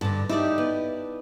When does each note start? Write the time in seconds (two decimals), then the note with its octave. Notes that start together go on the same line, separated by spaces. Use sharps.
0.01 G2 D3 A5
0.29 D#4 E4 G4 D5
0.58 B3